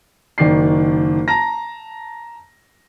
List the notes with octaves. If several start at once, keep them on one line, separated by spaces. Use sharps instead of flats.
F#1 D#3 D5 C7
A5 A#5 A#6